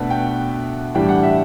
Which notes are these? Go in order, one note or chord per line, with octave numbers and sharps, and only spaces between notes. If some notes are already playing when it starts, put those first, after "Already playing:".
Already playing: B2 A3 D4 B4 F#5
G5
A2 E3 G3 D4 G5
F#5
E5